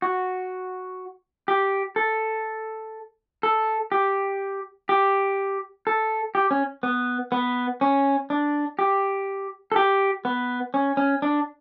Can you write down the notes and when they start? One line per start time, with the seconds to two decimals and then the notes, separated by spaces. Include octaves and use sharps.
0.02 F#4
1.48 G4
1.96 A4
3.43 A4
3.92 G4
4.89 G4
5.87 A4
6.35 G4
6.51 C#4
6.83 B3
7.32 B3
7.81 C#4
8.30 D4
8.79 G4
9.72 A4
9.76 G4
10.25 B3
10.74 C#4
10.97 C#4
11.22 D4